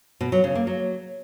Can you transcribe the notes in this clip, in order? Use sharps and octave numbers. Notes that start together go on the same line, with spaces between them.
B2
F#3
C#3
A#3
F#3